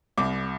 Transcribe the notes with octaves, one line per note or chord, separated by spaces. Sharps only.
C2 D6